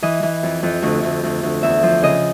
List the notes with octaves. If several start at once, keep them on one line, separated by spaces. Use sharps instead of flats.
E3 D#5
E3
F2
F2
D2
D2
D2
D2
E2 E5
F3
C#3 D#5